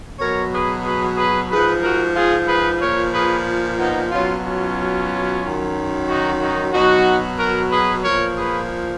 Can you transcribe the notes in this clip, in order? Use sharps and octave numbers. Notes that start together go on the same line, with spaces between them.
B2 F#3 A#4 C#5
G#4 B4
G#4 B4
G#4 B4
G#2 F3 G#4 B4
F#4 A#4
F4 G#4
G#4 B4
A#2 F3 A#4 C#5
G#4 B4
B3 D#4
B2 F#3 C#4 F4
C#4 F4
F#2 D#3 F#3
D#4 F#4
D#4 F#4
B2 F#3 D#4 F#4
F#4 A#4
G#4 B4
A#2 F3 A#4 C#5
G#4 B4